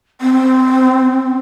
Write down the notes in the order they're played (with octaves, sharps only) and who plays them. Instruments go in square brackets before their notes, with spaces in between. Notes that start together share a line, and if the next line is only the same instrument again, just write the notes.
[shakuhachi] C4